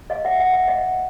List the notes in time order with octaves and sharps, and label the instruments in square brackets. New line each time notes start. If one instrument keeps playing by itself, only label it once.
[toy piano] D#5 F5
E5 F#5
E5 F#5
E5 F#5
D#5 F5